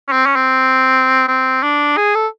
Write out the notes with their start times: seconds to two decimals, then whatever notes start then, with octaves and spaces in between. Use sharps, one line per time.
0.08 C#4
0.12 C4
0.26 C#4
0.36 C4
1.28 C4
1.63 D4
1.97 G#4
2.15 A4